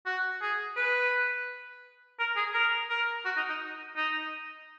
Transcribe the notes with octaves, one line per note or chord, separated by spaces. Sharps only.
F#4
G#4
B4
A#4
G#4
A#4
A#4
F#4
D#4
D#4
D#4